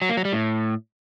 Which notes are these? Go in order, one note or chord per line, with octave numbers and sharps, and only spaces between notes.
F#3
A#3
F#3
G3
A2